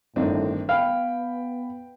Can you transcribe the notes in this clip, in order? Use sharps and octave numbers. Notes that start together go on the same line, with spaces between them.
G1 A2 D#3 C4 D4 D#4
B3 F5 G5 B5